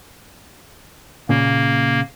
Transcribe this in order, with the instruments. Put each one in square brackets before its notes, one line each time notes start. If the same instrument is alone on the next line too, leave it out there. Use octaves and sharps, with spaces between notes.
[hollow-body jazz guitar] A#2 C#3 [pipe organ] A#3